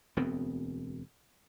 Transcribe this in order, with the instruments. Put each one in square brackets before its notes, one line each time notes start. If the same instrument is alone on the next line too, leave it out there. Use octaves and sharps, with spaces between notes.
[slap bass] E1 D2 B3 C4